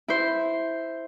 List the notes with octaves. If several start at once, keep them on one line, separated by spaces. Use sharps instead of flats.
E4 C5